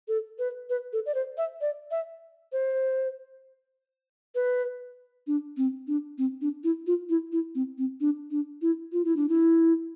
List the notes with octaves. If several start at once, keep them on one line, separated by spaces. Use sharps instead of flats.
A4
B4
B4
A4
D5
C5
E5
D5
E5
C5
B4
D4
C4
D4
C4
D4
E4
F4
E4
E4
C4
C4
D4
D4
E4
F4
E4
D4
E4